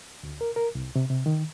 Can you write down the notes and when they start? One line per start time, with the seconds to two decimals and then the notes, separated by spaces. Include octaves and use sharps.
0.23 D2
0.41 A#4
0.56 A#4
0.75 C2
0.96 C3
1.10 C3
1.26 D#3